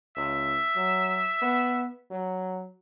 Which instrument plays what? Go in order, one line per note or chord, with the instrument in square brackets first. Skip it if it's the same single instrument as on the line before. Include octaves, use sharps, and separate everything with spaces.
[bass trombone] C#2 [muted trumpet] E5
[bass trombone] F#3
B3
F#3